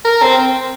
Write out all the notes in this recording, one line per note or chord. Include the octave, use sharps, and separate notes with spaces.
A#4
C4